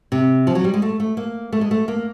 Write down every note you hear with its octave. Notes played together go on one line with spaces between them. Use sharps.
C3
F3
F#3
G3
G#3
A3
A3
A#3
A3
G#3
A3
A#3